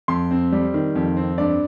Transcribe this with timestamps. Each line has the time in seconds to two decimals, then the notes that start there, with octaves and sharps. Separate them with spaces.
0.08 F2 C6
0.31 C4
0.52 G3
0.74 D#3
0.95 F2
1.17 C4
1.38 G2 D5